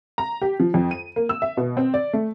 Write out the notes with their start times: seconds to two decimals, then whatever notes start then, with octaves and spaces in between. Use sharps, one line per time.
0.18 A#5
0.42 G4
0.60 F3
0.74 F2
0.91 D#7
1.16 A#3
1.29 E6
1.42 E5
1.57 B2
1.77 C4
1.94 D5
2.13 A3